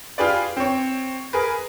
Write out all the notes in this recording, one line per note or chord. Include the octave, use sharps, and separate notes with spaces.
F4 G4 G#4 B4 D5
C4 C#5
G#4 A#4 B4